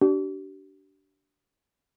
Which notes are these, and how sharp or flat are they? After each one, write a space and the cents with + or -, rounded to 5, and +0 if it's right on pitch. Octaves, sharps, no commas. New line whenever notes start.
D4 -10 G4 -45